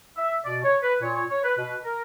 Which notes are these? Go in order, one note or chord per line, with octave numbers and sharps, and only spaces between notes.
E5
B2 D5
C#5
B4
A#2 C#5
C#5
C#5
B4
B2 B4
A#4